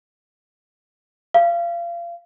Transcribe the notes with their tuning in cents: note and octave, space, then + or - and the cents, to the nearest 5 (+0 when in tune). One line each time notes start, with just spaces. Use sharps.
F5 -30